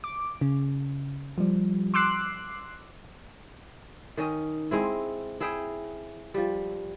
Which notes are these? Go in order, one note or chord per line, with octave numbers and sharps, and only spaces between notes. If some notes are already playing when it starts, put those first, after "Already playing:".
D6
C#3
F3 G3
C6 D6 E6 F#6 C7
D#3 C#4 D#5
G#3 C4 E4
E4 G#4 E5 G5
F3 G3